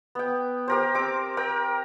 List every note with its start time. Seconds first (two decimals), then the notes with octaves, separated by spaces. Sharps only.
0.15 B3 G5
0.68 G4 A#4 C5
0.94 C4 D6
1.37 A#4 G5